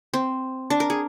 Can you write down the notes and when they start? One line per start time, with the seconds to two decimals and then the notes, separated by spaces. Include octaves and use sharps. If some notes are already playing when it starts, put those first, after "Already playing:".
0.14 C4
0.70 D4
0.80 A#4
0.90 G#4